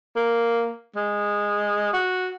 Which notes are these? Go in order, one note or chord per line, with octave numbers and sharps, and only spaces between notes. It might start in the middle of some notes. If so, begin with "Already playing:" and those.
A#3
G#3
F#4